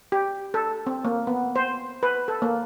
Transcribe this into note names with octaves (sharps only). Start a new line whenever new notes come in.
G4
A4
C4
A#3
B3
C5
B4
A4
A#3